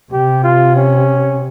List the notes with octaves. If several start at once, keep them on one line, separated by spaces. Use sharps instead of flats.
C3 G4
F4
C#4